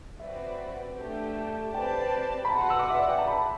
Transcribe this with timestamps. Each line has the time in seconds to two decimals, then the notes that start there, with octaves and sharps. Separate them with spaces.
0.20 C4 F#4 B4 D5 E5
0.97 A3 D4 G4
1.73 C4 G4 B4 D5 G5 A5
2.45 B5
2.51 F#4 B4 F#5 A5
2.61 C6
2.70 E6
2.79 D6
2.90 E5
2.99 D5
3.09 G5
3.18 A5
3.28 B5